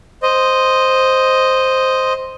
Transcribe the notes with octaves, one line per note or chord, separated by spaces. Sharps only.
C5 D#5